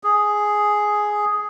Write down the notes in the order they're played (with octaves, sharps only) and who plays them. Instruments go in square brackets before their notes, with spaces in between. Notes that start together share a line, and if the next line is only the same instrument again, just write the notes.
[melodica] G#4